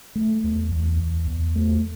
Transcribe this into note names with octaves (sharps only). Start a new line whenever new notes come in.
A3
E2
E2
E2
E2
A3